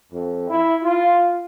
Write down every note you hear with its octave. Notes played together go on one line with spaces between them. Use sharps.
F2
E4
F4